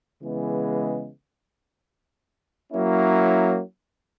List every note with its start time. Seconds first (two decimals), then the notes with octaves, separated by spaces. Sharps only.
0.21 C#3 E3 G#3 B3
2.73 F#3 A#3 C#4 E4